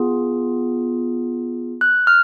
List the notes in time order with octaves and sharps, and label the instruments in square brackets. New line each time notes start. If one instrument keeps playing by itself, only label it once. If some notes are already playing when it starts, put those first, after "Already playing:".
Already playing: [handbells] B3 F4 G#4
F#6
F6